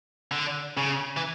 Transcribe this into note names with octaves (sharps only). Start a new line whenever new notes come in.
D3
C#3
E3